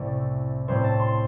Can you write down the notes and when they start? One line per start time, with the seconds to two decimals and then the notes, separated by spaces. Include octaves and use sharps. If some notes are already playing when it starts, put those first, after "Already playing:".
Already playing: C2 A2 C3 A3 C4 A4 C5 D5
0.68 A2 G3 C4 C5
0.84 A5
1.00 C6